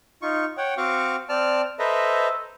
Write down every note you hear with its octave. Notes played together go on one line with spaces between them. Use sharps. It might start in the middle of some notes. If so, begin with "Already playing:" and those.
D#4 F4 C#6
C#5 F#5 G5
C4 F#4 F5 C#6 D6
C4 D5 A5 F6
A4 B4 C5 D#5 E5 A#5